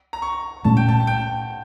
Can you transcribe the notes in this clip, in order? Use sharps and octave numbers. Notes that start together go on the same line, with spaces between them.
A#5
C#6
A#2 A3 C#4 A5
G5
A5
A5
G5